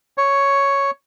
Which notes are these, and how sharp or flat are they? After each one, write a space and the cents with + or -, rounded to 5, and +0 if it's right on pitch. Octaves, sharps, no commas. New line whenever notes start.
C#5 +5